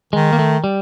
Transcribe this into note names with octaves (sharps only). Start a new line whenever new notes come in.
D#3 G#3
A#3
A3
G3